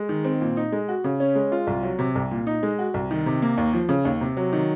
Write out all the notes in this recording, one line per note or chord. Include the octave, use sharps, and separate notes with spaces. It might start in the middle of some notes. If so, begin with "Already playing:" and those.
Already playing: G#3
D#3
C4
A#2
D#4
G#3
F#4
C#3
C#4
G#3
F4
C2
F#3
C3
C2
A#2
D#4
G#3
F#4
C2
D#3
C3
A#3
D#2
F3
C#3
D#2
C3
F#3
D#3